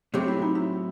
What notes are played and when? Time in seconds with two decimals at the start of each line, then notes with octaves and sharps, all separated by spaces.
0.14 A2 F#3 C4 G4
0.28 E4
0.42 D#4
0.55 E4